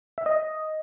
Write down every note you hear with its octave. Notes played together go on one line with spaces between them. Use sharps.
E5
D#5